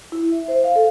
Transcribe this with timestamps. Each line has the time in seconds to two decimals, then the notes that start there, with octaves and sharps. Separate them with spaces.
0.12 E4
0.32 E5
0.48 C5
0.64 F5
0.76 A4